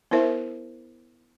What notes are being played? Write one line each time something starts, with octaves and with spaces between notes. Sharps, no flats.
B3 E4 A#4 C5 E5